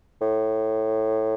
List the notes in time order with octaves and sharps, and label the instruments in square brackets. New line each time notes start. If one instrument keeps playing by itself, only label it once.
[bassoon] A2